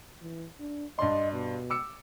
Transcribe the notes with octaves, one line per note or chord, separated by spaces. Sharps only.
E3
D4
G2 D4 D#5 C6
B2
D6 E6 C#7